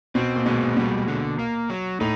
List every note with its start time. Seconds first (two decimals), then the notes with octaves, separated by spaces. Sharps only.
0.15 B2 C4
0.36 A#2
0.46 B2 G#3
0.77 B2 G3
1.08 D3
1.39 A#3
1.70 F#3
2.01 A2 D#4